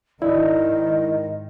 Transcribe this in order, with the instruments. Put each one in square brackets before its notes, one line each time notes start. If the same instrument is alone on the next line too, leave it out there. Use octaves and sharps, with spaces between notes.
[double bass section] G#2 D#3 [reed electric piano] E4 [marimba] D5 [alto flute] D#5